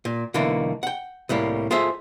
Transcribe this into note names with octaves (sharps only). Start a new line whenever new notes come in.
A#2
B1 D3 E3 A3 A#3
F#5 G5
C2 A2 G3 A#3
F4 G#4 A4 C5 E5